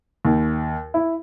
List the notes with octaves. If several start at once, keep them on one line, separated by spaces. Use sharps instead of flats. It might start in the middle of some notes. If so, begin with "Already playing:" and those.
D#2
E4